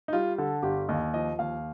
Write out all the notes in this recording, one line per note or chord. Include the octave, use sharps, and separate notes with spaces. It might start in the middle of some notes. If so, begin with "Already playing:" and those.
D#4
G3 F4
D3 A4
G1 G4
D#2 D#5
F3 D#5
D#2 F5